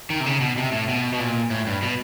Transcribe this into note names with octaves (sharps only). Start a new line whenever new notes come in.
D#3
C3
C#3
B2
C3
A2
B2
B2
A#2
A2
G2
B2